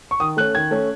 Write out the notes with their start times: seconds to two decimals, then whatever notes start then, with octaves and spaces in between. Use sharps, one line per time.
0.11 C#6
0.20 D#3 D#6
0.37 A3 C#4 F#6
0.55 D#3 G#6
0.71 A3 C#4